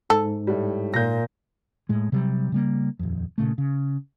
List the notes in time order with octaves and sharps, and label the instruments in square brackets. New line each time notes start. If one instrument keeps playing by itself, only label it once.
[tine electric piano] G#2 [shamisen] A4
[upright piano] A2 G3
[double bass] A#2 [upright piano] G6 A#6
[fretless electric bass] A2 G#3
C3 F#3 G3
C#3 G3 A#3
D#1 F2
A#2 C#3 A3
C#3